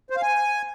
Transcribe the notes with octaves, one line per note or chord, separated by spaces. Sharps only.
C5
F5
G#5